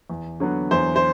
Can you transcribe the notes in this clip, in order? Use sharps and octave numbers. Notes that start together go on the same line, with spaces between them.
E2
D3 F#3 B3
E2 C5
C5